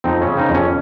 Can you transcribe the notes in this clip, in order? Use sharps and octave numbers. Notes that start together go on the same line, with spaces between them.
F2 C4 D#4
C#4
C#3
C4 D#4
F2
C#4